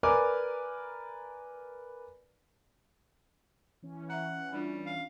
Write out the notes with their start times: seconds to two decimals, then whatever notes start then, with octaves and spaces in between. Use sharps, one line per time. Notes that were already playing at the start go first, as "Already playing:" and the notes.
0.03 A#4 B4 D5 G#5 D6 F6
3.82 E3 C#4
4.10 E5 F#5 A#5
4.53 G3 D4 F4
4.86 F5